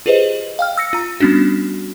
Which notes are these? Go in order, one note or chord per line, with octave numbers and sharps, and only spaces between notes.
F4 G4 G#4 B4 C5 D#5
F5 G5 F6
E6 A#6 C#7
F4 A#5
G3 B3 C#4 D4 F#4